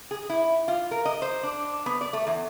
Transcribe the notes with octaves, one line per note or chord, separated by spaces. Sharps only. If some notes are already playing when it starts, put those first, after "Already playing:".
G#4
E4
F4
A#4
D#5
C5
D4
B3
D5
A3
E2